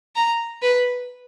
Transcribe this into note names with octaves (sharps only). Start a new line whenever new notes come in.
A#5
B4